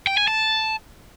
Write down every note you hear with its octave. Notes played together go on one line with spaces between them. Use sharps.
G5
G#5
A5